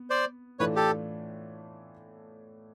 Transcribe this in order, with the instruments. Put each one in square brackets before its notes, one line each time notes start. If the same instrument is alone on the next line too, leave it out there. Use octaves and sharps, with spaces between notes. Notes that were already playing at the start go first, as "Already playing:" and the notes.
Already playing: [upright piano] B3
[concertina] C5 D5
[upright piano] A2 E3 A3 D4 F4 [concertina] B4 C#5
[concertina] G4 A4